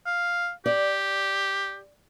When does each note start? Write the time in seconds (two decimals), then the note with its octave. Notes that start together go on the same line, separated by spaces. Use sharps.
0.06 F5
0.66 G4 D5